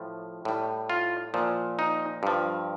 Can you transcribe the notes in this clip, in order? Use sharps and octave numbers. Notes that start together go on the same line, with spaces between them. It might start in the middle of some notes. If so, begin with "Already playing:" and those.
Already playing: A2 F3
A2 G3
F4
A#2 F3
D#4
G2 F3